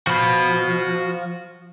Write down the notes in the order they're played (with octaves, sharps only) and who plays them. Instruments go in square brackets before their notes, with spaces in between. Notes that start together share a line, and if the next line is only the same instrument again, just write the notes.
[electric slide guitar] F3 [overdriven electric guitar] F#4 B5